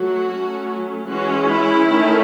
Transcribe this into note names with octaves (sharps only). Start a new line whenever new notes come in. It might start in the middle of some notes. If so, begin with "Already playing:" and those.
Already playing: F#3 A3 F#4
F#3 A3 C#4
E3 G#3 C#4 F#4
E4
D#3 A3 C#4